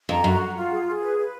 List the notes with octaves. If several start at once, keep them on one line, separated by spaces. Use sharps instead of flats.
F2 A#5
F#2 F#4
F#5
F4
G#4
G#4
B4
B4